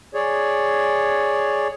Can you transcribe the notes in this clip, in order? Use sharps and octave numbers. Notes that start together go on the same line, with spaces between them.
G#4 C#5 D5